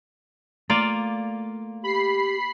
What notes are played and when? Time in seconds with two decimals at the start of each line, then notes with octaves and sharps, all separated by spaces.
0.70 A3 A#3 F4 D5
1.84 G4 B5 C7